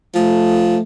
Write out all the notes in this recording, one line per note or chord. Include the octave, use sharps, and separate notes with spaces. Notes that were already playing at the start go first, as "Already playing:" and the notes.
F3 A3